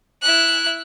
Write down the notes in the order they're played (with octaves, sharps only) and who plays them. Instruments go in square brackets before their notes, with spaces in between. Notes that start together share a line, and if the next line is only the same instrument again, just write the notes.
[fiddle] E4 F#6